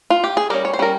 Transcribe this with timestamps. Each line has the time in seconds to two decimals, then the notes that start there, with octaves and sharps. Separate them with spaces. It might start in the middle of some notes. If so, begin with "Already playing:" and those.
0.10 F4
0.24 G4
0.37 G#4
0.50 G3 C#4 G4 A#4
0.65 C#5
0.73 C5
0.79 G3 C#4 A#4